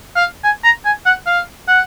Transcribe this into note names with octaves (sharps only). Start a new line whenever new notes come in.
F5
G#5
A#5
G#5
F#5
F5
F#5